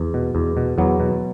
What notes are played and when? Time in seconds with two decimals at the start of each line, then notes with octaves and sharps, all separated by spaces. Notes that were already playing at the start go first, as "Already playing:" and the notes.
Already playing: E2
0.14 B2
0.35 E2
0.57 B2
0.78 E2 F#3 B3
1.00 B2